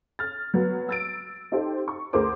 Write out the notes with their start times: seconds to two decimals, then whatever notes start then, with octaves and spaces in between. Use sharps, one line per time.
0.19 F6 A6
0.54 F#3 B3
0.89 E6 A6 D7
1.52 D#4 G4 A4 C5
1.88 C#6
2.13 D2 G#4 A#4 C5 D6